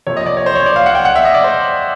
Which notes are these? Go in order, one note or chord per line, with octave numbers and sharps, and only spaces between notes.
C3 F3 A#3 C#5
D#5
D5
C#5
C5
C#5
D5
F5
F#5
G5
F#5
E5
D#5
D5
C5